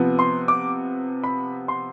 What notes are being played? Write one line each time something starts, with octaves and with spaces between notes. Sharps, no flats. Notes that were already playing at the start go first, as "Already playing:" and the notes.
Already playing: C3 F3 B3
C6
D6
B5
C6